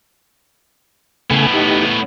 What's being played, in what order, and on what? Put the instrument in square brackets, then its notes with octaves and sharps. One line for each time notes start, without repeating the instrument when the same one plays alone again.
[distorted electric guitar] A2 B3 [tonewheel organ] C#3 A3 G#5
[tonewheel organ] D#4 G4